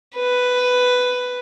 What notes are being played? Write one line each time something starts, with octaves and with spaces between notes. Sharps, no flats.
B4